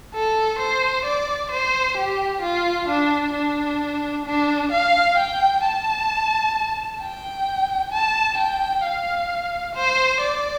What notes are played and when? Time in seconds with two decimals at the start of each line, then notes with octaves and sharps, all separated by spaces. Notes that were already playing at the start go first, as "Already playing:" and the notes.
0.14 A4
0.59 C5
1.05 D5
1.51 C5
1.97 G4
2.42 F4
2.89 D4
3.34 D4
4.26 D4
4.72 F5
5.18 G5
5.64 A5
7.01 G5
7.92 A5
8.37 G5
8.84 F5
9.75 C5
10.21 D5